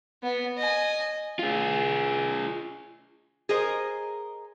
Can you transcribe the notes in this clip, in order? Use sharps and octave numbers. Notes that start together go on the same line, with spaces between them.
B3
D#5 G#5
F4 G#4
G#4 A#4 C5 D#5